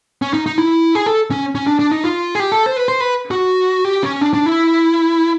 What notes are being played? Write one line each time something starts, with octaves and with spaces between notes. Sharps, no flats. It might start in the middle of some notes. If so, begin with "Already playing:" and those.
C#4
D#4
D#4
E4
G#4
A4
C#4
C#4
D4
D4
D#4
F4
G#4
G4
A4
C5
B4
C5
B4
F#4
G4
C#4
D4
D4
E4